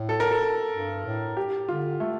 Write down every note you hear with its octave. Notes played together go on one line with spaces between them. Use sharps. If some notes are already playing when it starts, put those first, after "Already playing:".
Already playing: A2
A4
A#4
A4
G2
A2
G4
D3 F4
A3